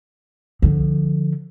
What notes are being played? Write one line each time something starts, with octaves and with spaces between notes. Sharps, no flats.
D3 F3